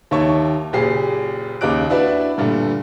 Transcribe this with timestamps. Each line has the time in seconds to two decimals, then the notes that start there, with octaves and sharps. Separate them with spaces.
0.11 D#2 D#3 C#5 E5 A5 C#6
0.73 F#1 A#2 G4 G#4 C7
1.61 D#2 C#3 D#5 D6 F#6 D7
1.90 D4 E4 F#4 B4 D5 E5
2.38 G2 A#2 D3 G3 A3